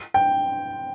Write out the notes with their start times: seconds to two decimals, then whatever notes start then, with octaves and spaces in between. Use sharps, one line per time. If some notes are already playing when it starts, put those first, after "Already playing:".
0.14 G5